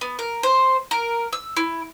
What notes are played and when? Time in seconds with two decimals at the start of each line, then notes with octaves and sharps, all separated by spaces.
0.01 B3
0.19 A#4
0.43 C5
0.91 A#4
1.33 E6
1.57 E4